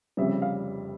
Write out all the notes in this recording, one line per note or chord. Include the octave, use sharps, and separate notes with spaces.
F1 F2 C#3 G3 E5
F5